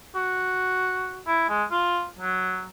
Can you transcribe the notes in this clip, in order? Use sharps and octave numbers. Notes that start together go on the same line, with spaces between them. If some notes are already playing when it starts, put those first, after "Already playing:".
F#4
E4
G#3
F4
F#3